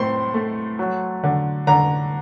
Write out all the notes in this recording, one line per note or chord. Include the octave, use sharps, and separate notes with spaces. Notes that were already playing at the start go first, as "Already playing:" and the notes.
Already playing: A2 C4 C6
A3
F#3
D3
D3 A#5